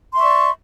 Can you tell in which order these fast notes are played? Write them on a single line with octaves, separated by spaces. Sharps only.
C6 E5 C#6 D5